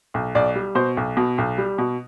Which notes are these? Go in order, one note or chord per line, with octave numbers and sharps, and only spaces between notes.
B1
B1 D5
G3
B2 C5
B1
B2
B1
G3
B2